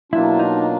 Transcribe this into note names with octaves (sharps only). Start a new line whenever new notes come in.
B2 F#3 A#3 D4 E4 F4
D#4